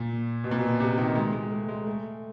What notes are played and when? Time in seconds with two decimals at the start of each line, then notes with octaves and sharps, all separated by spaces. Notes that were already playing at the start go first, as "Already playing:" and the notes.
Already playing: A#2
0.44 B2
0.51 A#2
0.58 B2
0.80 C3
0.98 D#3
1.15 G#3
1.33 G#3
1.51 A3
1.69 G#3
1.87 A3